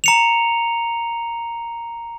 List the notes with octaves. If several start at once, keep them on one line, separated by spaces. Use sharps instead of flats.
A#5 C#7 F7